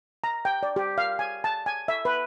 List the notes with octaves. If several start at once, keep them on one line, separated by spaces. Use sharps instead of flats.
A#5
G5
D5
G4
F5
G#5
A5
G#5
E5
B4